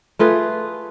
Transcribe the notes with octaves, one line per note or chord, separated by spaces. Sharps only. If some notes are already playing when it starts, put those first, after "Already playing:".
A3 F4 G#4 B4